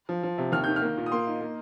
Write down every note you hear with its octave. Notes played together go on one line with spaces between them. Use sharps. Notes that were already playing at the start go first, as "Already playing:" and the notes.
F3
F3
C3
D#2 F6
D#3 G6
F6
A#3
A#2
D#6
A#3 C6
D#4
A#3